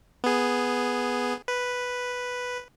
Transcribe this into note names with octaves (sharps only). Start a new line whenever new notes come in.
B3 G#4
B4